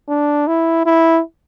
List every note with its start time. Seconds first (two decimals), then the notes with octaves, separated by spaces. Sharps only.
0.09 D4
0.47 E4
0.86 E4